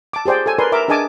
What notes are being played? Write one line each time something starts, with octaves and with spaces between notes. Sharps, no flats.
A5 D6
G4 G#4 C5 D5 G5
A4 G#5
A#4 B4 D5 G#5 C6
A#4 E5 D6
D4 G#4 D#5 G#5 A5 D6